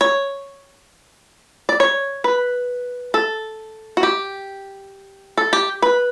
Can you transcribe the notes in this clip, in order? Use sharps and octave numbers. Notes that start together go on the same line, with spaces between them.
C#5
D5
C#5
B4
A4
F#4
G4
A4
G4
B4